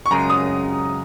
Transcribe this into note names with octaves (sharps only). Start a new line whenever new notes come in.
C#6
F#2 C#3 G#3 A#5
D#6